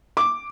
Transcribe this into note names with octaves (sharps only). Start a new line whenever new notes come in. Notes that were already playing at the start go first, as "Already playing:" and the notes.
D6